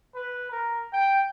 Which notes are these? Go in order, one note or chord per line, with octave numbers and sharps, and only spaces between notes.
B4
A#4
G5